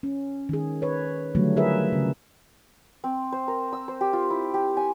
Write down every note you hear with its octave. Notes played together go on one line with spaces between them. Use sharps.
C#4
D#3 G#4
B4 C#5
D3 D#3 F#3 G3 A3
F4 G#4 A#4 B4 E5
C#3
C4
C5
A#4
E6
C5
G4
F4
E4
G4
G#5